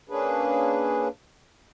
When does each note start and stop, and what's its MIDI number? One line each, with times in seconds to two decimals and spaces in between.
0.10 1.08 58
0.10 1.08 61
0.10 1.08 62
0.10 1.08 68
0.10 1.08 71